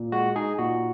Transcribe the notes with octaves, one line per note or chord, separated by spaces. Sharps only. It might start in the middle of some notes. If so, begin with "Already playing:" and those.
Already playing: A#2
G#3 F#4
D#4 G#4
A#2 F#4